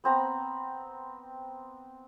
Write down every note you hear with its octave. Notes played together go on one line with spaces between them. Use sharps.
B3 C4 A#5 B5